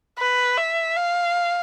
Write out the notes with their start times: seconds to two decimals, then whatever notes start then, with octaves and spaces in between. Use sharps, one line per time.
0.19 B4
0.58 E5
0.96 F5